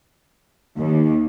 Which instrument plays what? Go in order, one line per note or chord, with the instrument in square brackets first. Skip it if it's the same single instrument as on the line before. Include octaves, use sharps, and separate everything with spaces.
[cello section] D#2